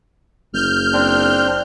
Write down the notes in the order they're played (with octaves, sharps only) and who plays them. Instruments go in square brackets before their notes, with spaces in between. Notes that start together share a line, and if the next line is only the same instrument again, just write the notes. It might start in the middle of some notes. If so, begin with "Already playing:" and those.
[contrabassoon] F#1 [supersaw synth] F6 G6
[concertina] C4 D4